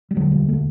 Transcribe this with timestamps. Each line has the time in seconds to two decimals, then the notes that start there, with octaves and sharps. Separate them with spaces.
0.11 G3
0.16 E1 D2 D3 F#3
0.32 G3
0.49 A3